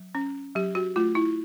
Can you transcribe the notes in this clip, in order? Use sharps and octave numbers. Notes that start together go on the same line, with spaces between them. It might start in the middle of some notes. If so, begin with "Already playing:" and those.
Already playing: F#3
C#4
F#3 G4
F#4
A3 F4
E4